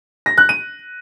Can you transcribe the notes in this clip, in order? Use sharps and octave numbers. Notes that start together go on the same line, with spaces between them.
A#6
F#6
D#7